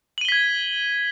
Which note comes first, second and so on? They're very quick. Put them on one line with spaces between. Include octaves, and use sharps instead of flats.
F#7 D#7 G7 B6 G#6